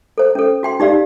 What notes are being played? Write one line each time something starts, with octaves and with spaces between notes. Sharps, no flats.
A4 C5
C#4 A4
F#4 G5 C6
D#4 G4 D5 F5